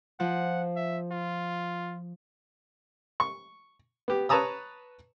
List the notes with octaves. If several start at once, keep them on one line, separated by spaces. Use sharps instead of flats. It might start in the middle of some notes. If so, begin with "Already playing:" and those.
F3 F#5
E5
F4
C#6
B3 G4
B4 C#5 A5 A#5 D#6 E6